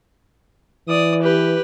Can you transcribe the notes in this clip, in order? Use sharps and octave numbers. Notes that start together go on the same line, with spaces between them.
E3 D5 D#6
G4 B4